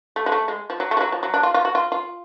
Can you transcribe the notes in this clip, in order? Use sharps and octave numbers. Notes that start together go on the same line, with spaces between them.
A3
G#3
A3
G#3
F3
F#3
A3
G#3
F#3
F3
F#3
D4
F4
F4
F#4
F4
F4